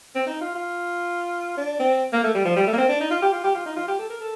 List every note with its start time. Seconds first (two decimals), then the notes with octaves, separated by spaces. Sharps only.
0.15 C4
0.27 D#4
0.41 F4
0.55 F4
1.57 D4
1.80 C4
2.12 A#3
2.23 A3
2.34 G3
2.45 F3
2.56 G3
2.67 A3
2.73 A#3
2.78 C4
2.89 D4
3.01 D#4
3.11 F4
3.22 G4
3.33 F4
3.44 G4
3.55 F4
3.66 D#4
3.76 F4
3.88 G4
3.99 A4
4.10 A#4
4.21 A4